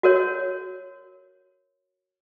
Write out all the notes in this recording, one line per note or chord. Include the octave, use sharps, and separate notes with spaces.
F#4 A#4 C#5